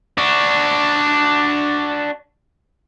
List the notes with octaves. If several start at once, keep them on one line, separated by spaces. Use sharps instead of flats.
D4 F#4